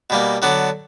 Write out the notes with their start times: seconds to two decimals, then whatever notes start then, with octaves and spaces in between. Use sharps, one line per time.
0.10 B2 G3 A#3
0.42 D3 F#3 B3 D4